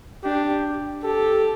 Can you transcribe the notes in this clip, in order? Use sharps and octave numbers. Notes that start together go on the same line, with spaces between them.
D4 G4
G4 A4